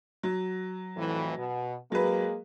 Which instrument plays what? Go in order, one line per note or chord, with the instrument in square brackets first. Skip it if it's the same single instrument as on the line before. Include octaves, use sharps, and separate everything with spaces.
[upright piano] F#3
[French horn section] F2 A2 E3
B2
[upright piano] F#3 B4 [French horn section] G#3 A#3 G#4